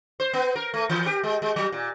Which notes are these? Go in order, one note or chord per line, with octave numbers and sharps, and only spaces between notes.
C5
B3
A#4
A3
E3
G4
G#3
G#3
F#3
A#2